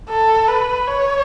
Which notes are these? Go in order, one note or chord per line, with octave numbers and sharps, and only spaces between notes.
A4
B4
C#5